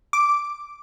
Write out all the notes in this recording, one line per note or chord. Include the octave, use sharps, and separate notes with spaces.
D6